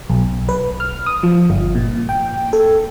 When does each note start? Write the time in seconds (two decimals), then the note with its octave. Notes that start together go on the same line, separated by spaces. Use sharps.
0.10 B1
0.49 B4
0.80 F6
1.06 D#6
1.23 F3
1.50 G1
1.75 A#2
2.09 G5
2.53 A4